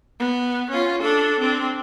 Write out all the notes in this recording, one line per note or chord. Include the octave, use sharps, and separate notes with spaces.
B3
C#4 F4
D4 A4
C4 D4